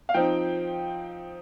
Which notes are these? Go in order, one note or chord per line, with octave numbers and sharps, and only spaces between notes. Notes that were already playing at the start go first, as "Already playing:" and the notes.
F5
F3 C4 D#4 G5